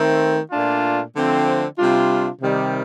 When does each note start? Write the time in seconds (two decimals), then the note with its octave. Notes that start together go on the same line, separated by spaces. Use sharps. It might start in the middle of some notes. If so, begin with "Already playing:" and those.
Already playing: D#3 A3 C4
0.51 A#2 A3 D4 F4
1.14 D3 F3 A3 C4
1.78 C3 G3 D4 F4
2.41 C3 D#3 G3